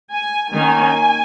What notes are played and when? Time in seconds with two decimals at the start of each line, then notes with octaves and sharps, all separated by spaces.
0.11 G#5
0.53 D#3 A#3 C#4 G#5